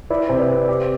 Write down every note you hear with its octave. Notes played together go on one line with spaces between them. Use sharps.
E4 B4 D5
C3 C5
B4 D5
C4
G4